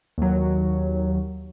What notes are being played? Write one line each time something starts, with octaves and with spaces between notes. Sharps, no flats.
D#2 F#3